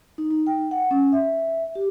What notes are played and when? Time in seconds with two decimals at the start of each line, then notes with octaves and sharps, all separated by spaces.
0.18 D#4
0.31 D#4
0.47 G5
0.71 F#5
0.91 C#4
1.12 E5
1.75 G4